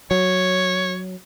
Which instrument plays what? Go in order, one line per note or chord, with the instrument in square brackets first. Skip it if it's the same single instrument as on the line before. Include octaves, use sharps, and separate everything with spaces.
[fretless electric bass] F#3 [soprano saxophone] C#5